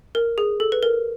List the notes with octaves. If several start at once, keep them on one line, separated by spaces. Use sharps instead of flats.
A#4
G#4
A4
B4
A#4